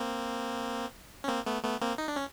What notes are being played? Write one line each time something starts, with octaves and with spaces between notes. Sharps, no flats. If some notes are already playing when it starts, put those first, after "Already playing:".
Already playing: A#3 C4
C#4
A#3 C4
A3 B3
A3 B3
A#3 C4
D#4
D4
C#4